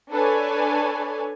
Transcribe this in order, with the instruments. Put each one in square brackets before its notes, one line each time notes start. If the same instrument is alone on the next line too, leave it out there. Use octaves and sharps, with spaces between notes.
[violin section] D4 A4 B4 C#5 G#5